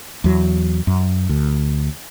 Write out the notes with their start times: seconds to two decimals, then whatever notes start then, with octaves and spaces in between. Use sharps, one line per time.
0.24 E2 F#3
0.87 F#2
1.29 D2